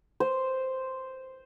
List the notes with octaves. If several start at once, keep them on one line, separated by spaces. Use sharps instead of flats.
C5